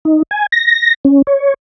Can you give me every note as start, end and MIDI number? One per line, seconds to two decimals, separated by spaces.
0.05 0.22 63
0.31 0.46 80
0.52 0.94 94
1.05 1.22 61
1.27 1.54 73